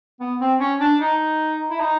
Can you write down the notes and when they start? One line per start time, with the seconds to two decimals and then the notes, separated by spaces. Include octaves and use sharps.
0.20 B3
0.41 C4
0.60 C#4
0.80 D4
1.00 D#4
1.70 E4
1.80 D#4